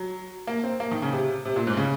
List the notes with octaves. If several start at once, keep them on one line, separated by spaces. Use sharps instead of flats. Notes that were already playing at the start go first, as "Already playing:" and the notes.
Already playing: F#3
A#3
C4
A#3
D#3
C#3
C3
C3
A#2
G#2
C#3